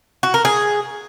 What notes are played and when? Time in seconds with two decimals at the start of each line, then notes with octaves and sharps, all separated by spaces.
0.23 F#4
0.34 A#4
0.45 G#4